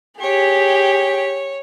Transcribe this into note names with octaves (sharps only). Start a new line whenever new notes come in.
G4 G#4 C#5